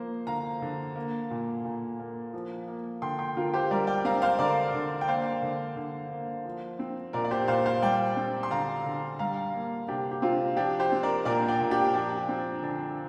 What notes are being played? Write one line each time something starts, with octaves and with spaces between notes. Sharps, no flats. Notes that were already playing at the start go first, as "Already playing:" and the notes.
Already playing: F3 A#3 C5
D3 F5 A#5
D3
A#3
A#2
A#2
A#3
F3
A#3
D3 G5 C6
G5 C6
D3 F4 A#4
G4 C5
G3 A#4 D5
D5 G5
C4 F5 A#5
C5 F5
D3 A#4 D5
D3
G5
A#3 C5 F5
D3
D3
A#3
F3
C4
A#2 A#4 D5
D5
G4 C5
A#2 C5 F5
C5 F5
G3 D5 G5
C4
C6
D3 F5 A#5
D3
G3 F5 A#5
A#3
C3 D4 G4
G4
C3 C4 F4
F3 D4 G4
G4 C5
C4
A#4 D5
A#2 A#4 D5
D5 G5
A#2
D4 G4
F3 D4 G4
C4
D3 D4